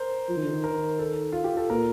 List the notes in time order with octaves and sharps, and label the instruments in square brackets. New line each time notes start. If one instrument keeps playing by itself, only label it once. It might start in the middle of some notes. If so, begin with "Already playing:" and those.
Already playing: [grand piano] A#4 C5
[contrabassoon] F3
D#3
D3
D#3
[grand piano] A#4
A4
F4
G4
A4
[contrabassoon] A#2 [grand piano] A#4